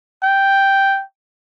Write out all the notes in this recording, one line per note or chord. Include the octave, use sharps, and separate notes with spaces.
G5